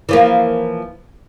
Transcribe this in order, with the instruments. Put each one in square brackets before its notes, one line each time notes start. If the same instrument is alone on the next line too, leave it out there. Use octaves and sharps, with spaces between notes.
[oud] E3 F3 A#3